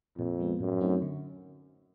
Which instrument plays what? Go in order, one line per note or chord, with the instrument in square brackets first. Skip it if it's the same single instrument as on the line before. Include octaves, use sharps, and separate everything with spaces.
[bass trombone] F2 [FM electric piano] A#2
[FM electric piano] F3 G#3 B3
[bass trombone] F#2 [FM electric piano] A2
[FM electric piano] F#3 A3 C4 D#4
D3